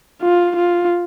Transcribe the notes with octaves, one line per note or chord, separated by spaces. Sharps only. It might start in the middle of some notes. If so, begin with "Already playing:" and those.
F4
F4